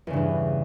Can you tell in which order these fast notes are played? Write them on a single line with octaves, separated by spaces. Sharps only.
E2 C#3 G2 E3